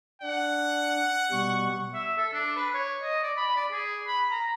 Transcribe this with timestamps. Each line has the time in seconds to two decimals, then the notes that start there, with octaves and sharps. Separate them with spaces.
0.22 D4 F#5
1.31 B2 G3 C#6
1.94 E5
2.18 A4
2.33 D4
2.56 B4
2.74 C#5
3.02 D#5
3.23 D5
3.37 B5
3.56 D5
3.72 G#4
4.07 B5
4.31 A#5